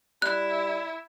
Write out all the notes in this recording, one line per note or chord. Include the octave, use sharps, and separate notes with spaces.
G3 E4 F#6